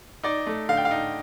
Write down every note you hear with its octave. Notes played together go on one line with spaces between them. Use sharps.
D#4 D5
A3
D3 F5
G5
F5
D#4